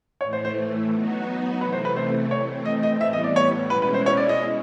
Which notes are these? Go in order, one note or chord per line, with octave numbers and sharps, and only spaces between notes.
A2 E3 A3 C#5
C5
C5
F#3 B3 D#4 F#4
C3 E3 A3 B4
C5
B4
C5
E3 A3 C4 C#5
D#5
D#5
A2 E3 G3 B3 E5
D#5
D5
C#5
B2 G#3 C#4 E4 B4
B4
C5
C#5
D5
D#5